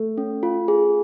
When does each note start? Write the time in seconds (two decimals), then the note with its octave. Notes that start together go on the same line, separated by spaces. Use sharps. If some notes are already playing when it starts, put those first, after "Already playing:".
Already playing: A3
0.18 C#4
0.43 F4
0.68 G#4